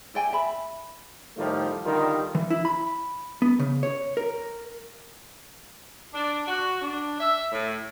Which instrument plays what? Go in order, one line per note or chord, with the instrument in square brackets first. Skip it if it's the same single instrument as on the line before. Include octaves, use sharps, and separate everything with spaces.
[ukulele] E4 D5 G5 G#5
E5 B5
[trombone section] A2 D#3 F3 G3 A3
D3 D#3 G3 F4 A#4
[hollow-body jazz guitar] E3
E4
B5
B3
C#3
C#5
A#4
[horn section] D4
F#4
D4
E5
A2